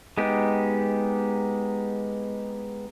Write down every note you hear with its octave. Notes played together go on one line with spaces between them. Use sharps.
G#3 B3 D#4 G4